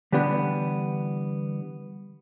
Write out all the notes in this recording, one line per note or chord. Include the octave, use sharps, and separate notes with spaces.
D3 E3 G3 B3 D4